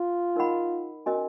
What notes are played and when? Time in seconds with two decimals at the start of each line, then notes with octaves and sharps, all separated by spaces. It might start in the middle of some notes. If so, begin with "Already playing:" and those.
Already playing: F4
0.36 D#4 A#4 D#5 F#5 B5
1.06 C#4 F#4 A#4 D#5 G#5